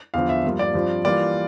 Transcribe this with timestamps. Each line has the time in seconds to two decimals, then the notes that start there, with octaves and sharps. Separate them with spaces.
0.14 E2 D3 F3 F5
0.29 E5
0.44 G2 F3 A#3 F4
0.59 D5
0.74 G2 F3 C4 F4
1.05 E3 G3 A#3 F4 D5